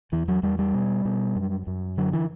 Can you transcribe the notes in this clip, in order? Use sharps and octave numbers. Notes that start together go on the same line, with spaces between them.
E2 E3
F#3
E2 G3
G3
B2
B2
F#2
F#2
D3 F#3
E3